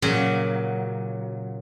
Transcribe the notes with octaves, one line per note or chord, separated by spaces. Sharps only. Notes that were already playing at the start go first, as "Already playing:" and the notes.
A#2 C#3 F#3